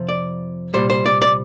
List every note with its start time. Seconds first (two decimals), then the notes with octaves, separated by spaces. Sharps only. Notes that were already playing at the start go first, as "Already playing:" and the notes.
Already playing: F2 C3 F3
0.09 D5
0.74 C2 A#2 G3 C5
0.90 C5
1.06 D5
1.22 D5